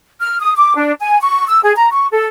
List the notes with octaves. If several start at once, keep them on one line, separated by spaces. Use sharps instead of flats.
F6
D#6
D6
D4
G#5
C#6
E6
G#4
A#5
C#6
A4